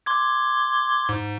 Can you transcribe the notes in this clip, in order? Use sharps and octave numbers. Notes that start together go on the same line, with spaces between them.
C6 D6 G#6
G#2